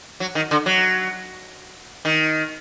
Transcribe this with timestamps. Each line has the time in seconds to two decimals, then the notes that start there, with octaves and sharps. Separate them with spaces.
0.20 F#3
0.35 D#3
0.51 D3
0.66 F#3
2.05 D#3